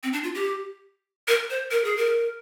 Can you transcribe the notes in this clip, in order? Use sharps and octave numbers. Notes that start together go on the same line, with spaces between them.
C4
D4
F4
G4
A#4
C5
A#4
G#4
A#4